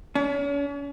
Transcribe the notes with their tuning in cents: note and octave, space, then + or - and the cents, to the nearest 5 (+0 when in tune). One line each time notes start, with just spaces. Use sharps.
C#4 +40